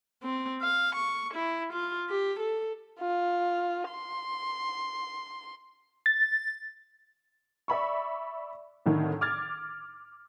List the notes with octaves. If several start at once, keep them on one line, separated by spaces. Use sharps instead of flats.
C4
F5
C#6
E4
F4
G4
A4
F4
C6
A6
D5 E5 B5 C#6
C2 A2 D3 D#3
D6 F6 G#6 A6